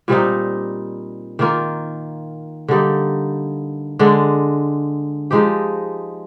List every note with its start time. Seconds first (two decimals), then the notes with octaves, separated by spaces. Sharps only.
0.08 A#2 G3 C4 D#4
1.39 D#3 A#3 F4
2.68 D3 G3 A#3 D#4
3.99 D3 G#3 D4
5.31 F3 G#3 D#4 G4